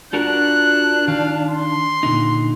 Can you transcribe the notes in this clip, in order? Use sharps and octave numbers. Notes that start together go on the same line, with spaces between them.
D4 F4 F#4 A#4 F#6
D#3 F5
C6
A#2 D3 D#4